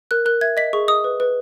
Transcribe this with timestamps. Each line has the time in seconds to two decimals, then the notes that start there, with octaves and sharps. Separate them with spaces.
0.11 A#4 F#6
0.26 A#4 F#6
0.41 E5 G#6
0.57 D#5 B6
0.73 G#4 C#6
0.88 D#5 D#6
1.04 B4
1.20 B4